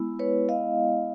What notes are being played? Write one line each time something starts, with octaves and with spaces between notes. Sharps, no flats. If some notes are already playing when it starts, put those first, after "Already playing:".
Already playing: G#3 B3 E4
B4 C#5
D#5 F5